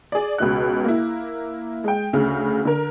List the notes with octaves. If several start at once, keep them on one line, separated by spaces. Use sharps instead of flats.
G#4 D5
C#2 B2 F#6
A#3 E4
G#3 G5
D2 C#3
D3 A#4